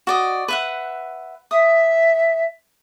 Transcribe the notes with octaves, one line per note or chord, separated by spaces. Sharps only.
F#4 D5 D#5
B4 E5 F#5
E5 D#6